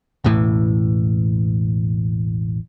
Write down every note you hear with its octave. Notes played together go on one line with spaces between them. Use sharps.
E1 A1 A2 E3